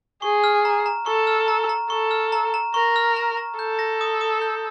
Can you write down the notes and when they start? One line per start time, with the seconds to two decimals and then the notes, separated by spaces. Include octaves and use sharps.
0.22 G#4 C#6
0.44 F6
0.65 A#5
0.86 A#5
1.06 A4 C#6
1.27 F6
1.48 A#5
1.69 A#5
1.90 A4 C#6
2.11 F6
2.32 A#5
2.54 A#5
2.74 A#4 C#6
2.96 F6
3.16 A#5
3.37 A#5
3.58 A4 G6
3.79 A#6
4.01 D#6
4.21 D#6
4.42 G6